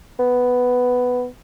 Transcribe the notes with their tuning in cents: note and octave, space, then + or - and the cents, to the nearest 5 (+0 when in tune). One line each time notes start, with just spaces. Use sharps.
B3 +5